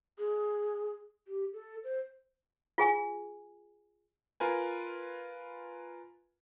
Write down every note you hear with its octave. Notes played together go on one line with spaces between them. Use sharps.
G#4
G4
A4
C5
F4 G#4 G#5
F4 A#4 B4 G#5